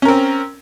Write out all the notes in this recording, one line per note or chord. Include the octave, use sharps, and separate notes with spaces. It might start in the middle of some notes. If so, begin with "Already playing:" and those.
C4 C#4 A#4